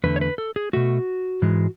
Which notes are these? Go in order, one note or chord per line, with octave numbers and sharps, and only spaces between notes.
E2 D3 A3 B4
C#5
B4
A4
G#4
B2 A3 F#4
G#2 E3 G#3